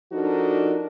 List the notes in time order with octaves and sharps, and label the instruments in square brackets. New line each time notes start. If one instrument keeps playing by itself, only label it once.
[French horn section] F3 D4 D#4 F#4 A4 A#4